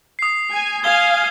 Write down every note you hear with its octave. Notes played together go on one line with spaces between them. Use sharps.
D#6 C7
G#5
F5 G#5 G#6 G7